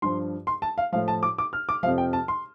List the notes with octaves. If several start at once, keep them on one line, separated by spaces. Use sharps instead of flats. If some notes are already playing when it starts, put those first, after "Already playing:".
G2 F3 C6
C6
A5
F5
A2 F3 F5
A5
D6
D6
F6
D6
F2 C3 F3 F5
G5
A5
C6